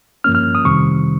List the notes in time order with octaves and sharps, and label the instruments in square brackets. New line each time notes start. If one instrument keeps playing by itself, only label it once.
[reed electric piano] G2 F3 A#3 C#4 F6
F6
D#6
F2 C3 D#3 G3 C4 C#6